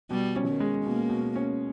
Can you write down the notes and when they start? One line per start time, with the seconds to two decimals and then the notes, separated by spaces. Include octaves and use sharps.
0.10 B2 G3
0.36 C#4
0.48 D#3
0.60 G#3
0.85 B2 A#3
1.09 B2
1.36 C#4